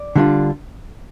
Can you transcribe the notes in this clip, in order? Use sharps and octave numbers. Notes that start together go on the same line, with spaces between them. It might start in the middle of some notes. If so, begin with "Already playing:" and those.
Already playing: D5
D3 G3 D4 F4